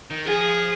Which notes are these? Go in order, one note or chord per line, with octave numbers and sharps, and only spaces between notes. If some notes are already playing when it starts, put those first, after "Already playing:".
D#3
F3 G#4